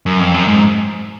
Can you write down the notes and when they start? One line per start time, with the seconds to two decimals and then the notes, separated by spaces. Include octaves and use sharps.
0.06 F#2
0.20 F2
0.34 F#2
0.48 G#2